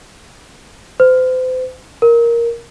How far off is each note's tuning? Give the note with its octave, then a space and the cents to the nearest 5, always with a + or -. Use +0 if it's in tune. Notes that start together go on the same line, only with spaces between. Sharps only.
C5 -35
A#4 +5